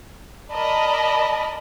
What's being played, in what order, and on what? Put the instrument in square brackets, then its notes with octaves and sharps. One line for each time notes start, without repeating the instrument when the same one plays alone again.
[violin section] A#4 D5 D#5 A5 B5